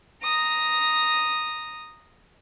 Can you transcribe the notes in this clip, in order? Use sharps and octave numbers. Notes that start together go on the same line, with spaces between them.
A#5 D#6